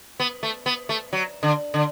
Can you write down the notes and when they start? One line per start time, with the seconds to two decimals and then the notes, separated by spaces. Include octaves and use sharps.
0.20 B3
0.43 A3
0.66 B3
0.89 A3
1.13 F#3
1.43 D3
1.74 D3